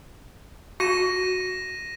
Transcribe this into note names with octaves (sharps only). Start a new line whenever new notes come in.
F#4 A#6 D#7 E7